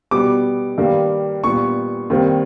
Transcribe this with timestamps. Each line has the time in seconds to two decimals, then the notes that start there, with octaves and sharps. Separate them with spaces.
0.11 B2 G3 B3 D6
0.78 G2 D#3 G3 A#3
1.44 A#2 G3 B3 C#6
2.10 D#2 D#3 G3 C4